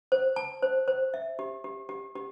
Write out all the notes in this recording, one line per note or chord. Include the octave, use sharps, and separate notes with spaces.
C5
A5
C5
C5
E5
G4
G4
G4
G4